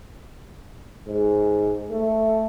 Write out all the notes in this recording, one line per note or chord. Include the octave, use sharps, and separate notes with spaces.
G#2
A3